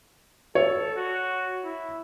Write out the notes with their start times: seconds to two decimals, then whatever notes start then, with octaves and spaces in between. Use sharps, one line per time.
0.55 A4 C#5
0.96 F#4
1.64 E4